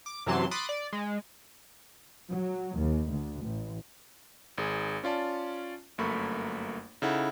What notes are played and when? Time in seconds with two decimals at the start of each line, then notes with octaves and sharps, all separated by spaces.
0.06 D6
0.26 F#2 C3 E3 F#3 A5 C6
0.51 B5 C6 D6 D#6 F#6 A6
0.69 D5
0.93 G#3
2.30 F#3
2.78 D#2
3.09 D2
3.44 A1
4.58 G#1 G#4
5.03 C#4 F4 D5 A5
5.98 G1 F#2 A3 A#3 B5 C#6
7.02 C#3 D#4 E4 A4 F#5